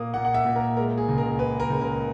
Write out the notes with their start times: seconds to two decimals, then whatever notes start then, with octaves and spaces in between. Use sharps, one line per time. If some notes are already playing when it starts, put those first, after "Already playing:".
Already playing: A#2 A#3 D#6
0.14 A#2 F#5
0.25 F#5
0.34 E5
0.45 A#2
0.56 A#4
0.77 G#3 A#4
0.98 G#4
1.08 C#2
1.18 A#4
1.39 G#3 B4
1.60 A#4
1.70 C#2
1.81 A#4